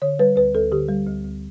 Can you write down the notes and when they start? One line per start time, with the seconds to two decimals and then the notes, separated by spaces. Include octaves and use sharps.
0.02 D3 C#5
0.19 G3 B4
0.36 D2 B4
0.55 D2 A4
0.72 D3 G4
0.89 G3
1.07 D2
1.25 D2